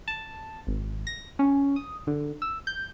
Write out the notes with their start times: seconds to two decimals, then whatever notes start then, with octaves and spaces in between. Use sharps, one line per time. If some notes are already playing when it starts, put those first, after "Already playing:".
0.08 A5
0.67 G#1
1.07 A#6
1.39 C#4
1.76 D#6
2.07 D3
2.42 E6
2.67 G6